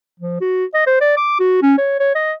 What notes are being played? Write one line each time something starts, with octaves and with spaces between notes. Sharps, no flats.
F3
F#4
D#5
C5
D5
D6
F#4
C#4
C#5
C#5
D#5